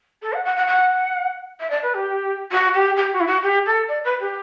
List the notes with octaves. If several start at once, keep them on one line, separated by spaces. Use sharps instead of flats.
A4
F#5
F#5
F#5
F#5
E5
D5
B4
G4
F#4
G4
G4
F#4
E4
F#4
G4
A4
D5
B4
G4